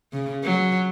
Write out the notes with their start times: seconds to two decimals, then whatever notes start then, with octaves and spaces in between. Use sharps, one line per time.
0.13 C#3
0.44 F#3